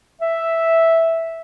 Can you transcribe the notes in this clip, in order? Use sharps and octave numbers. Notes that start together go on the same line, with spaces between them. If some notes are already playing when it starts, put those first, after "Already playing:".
E5